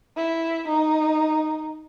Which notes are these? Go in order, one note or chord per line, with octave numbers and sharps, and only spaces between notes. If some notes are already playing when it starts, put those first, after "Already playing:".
E4
D#4